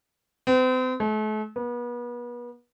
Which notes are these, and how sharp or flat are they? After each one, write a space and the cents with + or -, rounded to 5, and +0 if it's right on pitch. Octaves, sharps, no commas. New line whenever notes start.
C4 -40
A3 -40
B3 -35